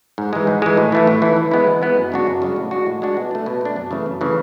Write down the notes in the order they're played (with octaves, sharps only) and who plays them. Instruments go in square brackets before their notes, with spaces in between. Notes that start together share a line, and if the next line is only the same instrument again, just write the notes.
[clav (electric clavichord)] G#2
E3 G#3
G#2
E3 G#3
A2
E3 A3 E4
A2
E3 A3 E4
E3
G#3 B3 E4
E3
G#3 B3 E4
F#2
C#3 G#3 D4 F#4
F#2
C#3 G#3 D4 F#4
A2
G#3 D4 F#4
A2
G#3 D4 F#4
B2
A3 D4
B2
A3 D4
F#2
C#3 E3 A3
F#2
C#3 E3 A3